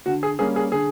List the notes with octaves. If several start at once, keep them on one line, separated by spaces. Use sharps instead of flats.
D3 F#4
G#4
G3 A#3 C#4 G#4
G#4
D3 G#4